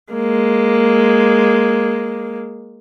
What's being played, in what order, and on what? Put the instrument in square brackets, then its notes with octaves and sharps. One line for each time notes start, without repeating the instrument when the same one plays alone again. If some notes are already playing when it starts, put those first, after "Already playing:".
[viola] G#3 A#3